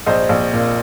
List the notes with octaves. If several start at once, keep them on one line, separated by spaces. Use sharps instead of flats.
A#1 C5 D#5
A#1
A#2